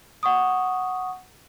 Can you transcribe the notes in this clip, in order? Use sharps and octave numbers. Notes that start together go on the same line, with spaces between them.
F#5 C#6 D#6